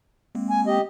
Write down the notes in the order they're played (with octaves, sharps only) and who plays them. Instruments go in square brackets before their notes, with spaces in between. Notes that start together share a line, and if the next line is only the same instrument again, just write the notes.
[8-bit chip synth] G#3 A#3 C4
[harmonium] G#5
G4 D#5